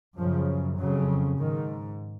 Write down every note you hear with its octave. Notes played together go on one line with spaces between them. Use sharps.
F#2 C#3 F3
F2 C#3 F#3
G#2 D#3